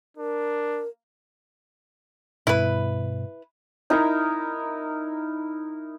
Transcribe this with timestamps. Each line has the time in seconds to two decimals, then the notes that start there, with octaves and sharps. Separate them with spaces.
0.17 D4 A#4
2.47 G2 B2 E4 B4
3.90 D#4 E4 A#4 A#5